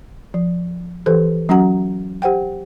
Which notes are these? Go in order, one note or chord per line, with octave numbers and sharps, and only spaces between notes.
F3
E3 G4 A4 C5
F#3 C#4 F#4 F#5 A#5
G4 C5 F#5 G5